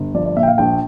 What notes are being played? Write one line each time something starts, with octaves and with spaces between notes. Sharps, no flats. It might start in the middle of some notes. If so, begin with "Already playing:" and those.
Already playing: G1
F3 D5
D5
A#2 E5
G5
F5
A#1 G5